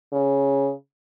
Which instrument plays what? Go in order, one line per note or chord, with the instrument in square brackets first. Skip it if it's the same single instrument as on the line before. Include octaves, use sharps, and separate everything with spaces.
[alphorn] C#3